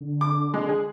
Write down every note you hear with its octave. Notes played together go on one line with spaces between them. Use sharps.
D3
D6
G#3
G#4